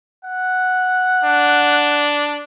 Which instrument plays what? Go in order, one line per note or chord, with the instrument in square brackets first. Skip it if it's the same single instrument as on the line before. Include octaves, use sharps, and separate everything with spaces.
[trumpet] F#5
[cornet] D4